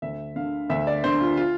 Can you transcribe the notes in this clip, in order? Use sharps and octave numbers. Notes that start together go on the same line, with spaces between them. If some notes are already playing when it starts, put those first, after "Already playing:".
D2 E5
D3 F5
D2 E5
D5
D3 C5
F4
F4